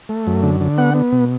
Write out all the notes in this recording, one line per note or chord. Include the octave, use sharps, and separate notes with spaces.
A3
F#2
D3
D3
B3 F#5
B3
B2